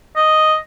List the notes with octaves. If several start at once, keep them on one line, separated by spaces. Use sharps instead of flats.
D#5